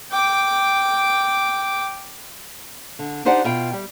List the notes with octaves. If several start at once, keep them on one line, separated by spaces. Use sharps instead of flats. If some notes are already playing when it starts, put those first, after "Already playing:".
G5 D6
D3
D4 D#4 G4 C5 D5 F#5
B2 F4 G5
G3